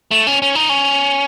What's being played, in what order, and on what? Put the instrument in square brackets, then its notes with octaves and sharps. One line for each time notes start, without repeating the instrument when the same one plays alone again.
[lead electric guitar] A3
C#4
C#4
D#4
C#4